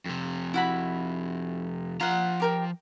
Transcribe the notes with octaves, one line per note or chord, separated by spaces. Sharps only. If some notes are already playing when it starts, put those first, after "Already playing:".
F2 C3
E4 F#4 B5
F3 F4 F#5 A#5
G4 A#4 G5